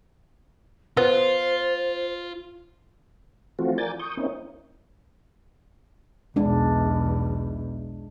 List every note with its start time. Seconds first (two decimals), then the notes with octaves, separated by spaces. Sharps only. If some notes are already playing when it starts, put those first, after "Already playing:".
0.97 B3 F4 C5
3.59 E3 F3 A3 C4 F4 F#4
3.78 A#4 D5 G#5 G6 A6
3.99 C#6 D#6 G6
4.17 A#3 C4 C#4 D#4 E4
6.36 B1 E2 G#3 D4